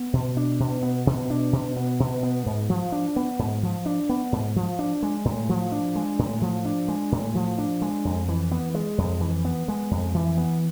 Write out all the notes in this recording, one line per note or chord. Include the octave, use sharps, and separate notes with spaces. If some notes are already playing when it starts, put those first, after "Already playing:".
Already playing: B3
B2
D4
B2
B3
B2
D4
B2
B3
B2
B3
G#2
F3
D4
B3
G#2
F3
D4
B3
G#2
F3
D4
G#3
A2
F3
D4
G#3
A2
F3
D4
G#3
A2
F3
D4
G#3
F2
E3
B3
G#3
F2
E3
B3
G#3
F2
E3
B3